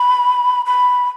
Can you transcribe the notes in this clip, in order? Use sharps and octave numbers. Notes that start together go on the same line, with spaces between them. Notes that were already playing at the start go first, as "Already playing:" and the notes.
Already playing: B5
B5